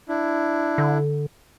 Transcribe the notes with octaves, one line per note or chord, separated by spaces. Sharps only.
D4 E4
D3